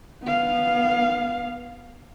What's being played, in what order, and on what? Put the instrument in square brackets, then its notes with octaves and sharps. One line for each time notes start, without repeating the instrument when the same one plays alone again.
[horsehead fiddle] B3 F5